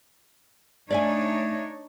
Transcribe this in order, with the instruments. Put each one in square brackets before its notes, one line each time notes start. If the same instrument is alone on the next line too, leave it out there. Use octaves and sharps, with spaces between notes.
[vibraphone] A3 [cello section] D4 D#4 C#5 [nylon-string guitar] D5 E5 G#5